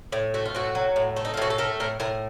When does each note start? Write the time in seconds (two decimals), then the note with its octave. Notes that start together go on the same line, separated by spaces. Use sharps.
0.12 A2
0.34 A3 F#4
0.45 F4
0.55 A2 F#4
0.75 F#3
0.96 A2
1.16 A3
1.25 D#4
1.34 F4
1.37 A2 F#4
1.50 A4
1.58 A3 A#4
1.80 A2 A#4
2.00 A2 A#4